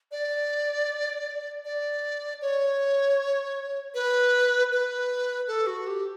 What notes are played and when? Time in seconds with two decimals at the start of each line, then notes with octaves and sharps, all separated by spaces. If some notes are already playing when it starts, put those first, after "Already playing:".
0.12 D5
1.65 D5
2.42 C#5
3.95 B4
4.72 B4
5.48 A4
5.67 F#4
5.87 G4